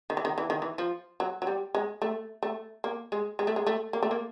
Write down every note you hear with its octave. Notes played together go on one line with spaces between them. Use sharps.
D#3
E3
D#3
E3
D#3
E3
F3
F#3
F#3
G3
G#3
A3
A3
A#3
G#3
G#3
A3
G#3
A3
A#3
A3
A#3